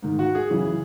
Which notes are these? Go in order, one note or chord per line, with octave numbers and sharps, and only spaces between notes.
G#2 D#3
F#4
G#4
F#2 C#3 E3